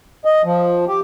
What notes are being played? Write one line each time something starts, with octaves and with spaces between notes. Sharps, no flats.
D#5
F3
G4